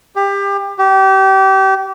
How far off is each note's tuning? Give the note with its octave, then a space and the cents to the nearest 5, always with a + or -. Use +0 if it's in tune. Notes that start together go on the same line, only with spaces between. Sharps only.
G4 +25
G4 -30